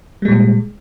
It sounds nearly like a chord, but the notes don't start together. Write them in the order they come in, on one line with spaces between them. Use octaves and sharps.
G3 G#3 A#2